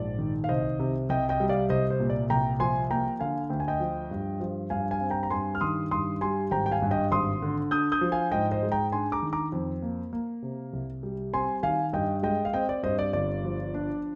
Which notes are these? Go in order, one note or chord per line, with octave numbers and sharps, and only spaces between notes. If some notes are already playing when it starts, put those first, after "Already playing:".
Already playing: A#1 G#2 D5
D#3
F5
C2 C5 D#5
C3
C2 D#5 G5
D#5 G5
G3
D5 F5
C2 C5 D#5
C5
A#2
D5
C2 G5 A#5
F3 G#5 C6
A#3 G5 A#5
D3 F5 G#5
D2 G5
G#5
D#5 G5
F3
G2
F3
G2 F5 G#5
F5 G#5
C4
G5 A#5
A#5
G2 G#5 C6
F6
D#3 C6 D#6
G2 C6 D#6
G3 G#5 C6
G#1 G5 A#5
G5
F5 G#5
G2
D#5 G5
G#1 C6 D#6
D3
D4 D#6 G6
D#6 G6
F3
F5 G#5
G#2 D#5 G5
C5 D#5
G#3
G5 A#5
D4 G#5 C6
A#5 D6
D#3
A#5 D6
F2
A#3
A#3
C3
C2
G3
C4 G#5 C6
D#3 F5 G#5
G2 D#5 G5
G#3 D#5 G5
F5
C4 D#5 G5
D5
G2 C5 D#5
D5
G1 D5
F3
D4